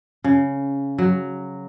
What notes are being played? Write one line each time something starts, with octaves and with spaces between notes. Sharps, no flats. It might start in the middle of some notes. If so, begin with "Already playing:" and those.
C#3
F#3